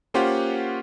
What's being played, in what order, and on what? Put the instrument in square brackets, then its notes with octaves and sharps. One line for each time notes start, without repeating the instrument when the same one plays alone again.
[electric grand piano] A#3 C#4 F4 G4 C5 F#5